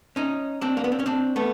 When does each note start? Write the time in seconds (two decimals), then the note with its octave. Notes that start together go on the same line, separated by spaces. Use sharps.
0.16 C#4 D#4
0.61 C4 D4
0.77 A#3
0.84 B3
0.92 C4
0.99 C#4
1.06 C4 D4
1.36 A3 B3